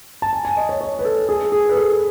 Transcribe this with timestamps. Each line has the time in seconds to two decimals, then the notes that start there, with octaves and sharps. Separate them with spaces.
0.22 A5
0.33 G#5
0.45 G#5
0.57 D#5
0.69 C#5
0.81 C#5
0.99 B4
1.05 A4
1.29 G#4
1.52 G#4
1.69 B4
1.76 A4